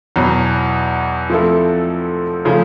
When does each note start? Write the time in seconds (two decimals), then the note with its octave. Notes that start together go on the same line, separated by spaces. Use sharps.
0.16 E2 B2 F#3
1.30 F3 A3 C4 E4 A4
2.45 C#3 F3 A3